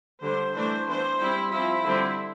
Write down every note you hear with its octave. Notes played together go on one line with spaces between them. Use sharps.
D3 G3 D4 C5
E3 A3 D4 C5
E3 B3 D4 C5
G3 C4 E4
F3 C4 E4
D3 G3 C4